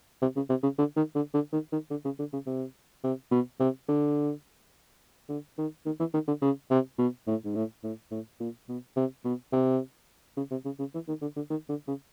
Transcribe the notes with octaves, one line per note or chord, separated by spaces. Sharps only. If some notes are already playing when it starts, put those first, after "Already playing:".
C3
C#3
C3
C#3
D3
D#3
D3
D3
D#3
D#3
D3
C#3
D3
C#3
C3
C3
B2
C3
D3
D3
D#3
D#3
E3
D#3
D3
C#3
C3
B2
A2
G#2
A2
A2
A2
A#2
B2
C3
B2
C3
C#3
C3
C#3
C#3
E3
D#3
D3
D3
D#3
D3
C#3